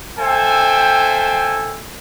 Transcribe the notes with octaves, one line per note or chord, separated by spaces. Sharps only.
A4 C5 E5 F5 G5 G#5